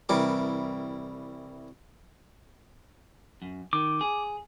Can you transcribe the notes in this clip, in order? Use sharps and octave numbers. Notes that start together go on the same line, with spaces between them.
C2 E3 G3 A#4 D6
F#2
D#3 D6
G#4